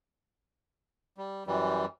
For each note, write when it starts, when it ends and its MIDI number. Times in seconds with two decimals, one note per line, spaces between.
1.18 1.44 55
1.47 1.86 42
1.47 1.86 52
1.47 1.86 55